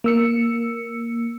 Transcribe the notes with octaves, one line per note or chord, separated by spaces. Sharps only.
A#3 E6 C#7